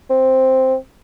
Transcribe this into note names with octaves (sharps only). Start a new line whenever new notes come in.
C4